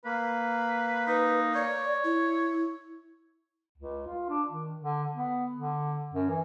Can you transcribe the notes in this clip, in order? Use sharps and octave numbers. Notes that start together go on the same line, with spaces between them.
A#3 B4
D#4 B4
C#5 D5
E4
C#2
F4
D4
D#3
D3
B3
D3
F#2
E3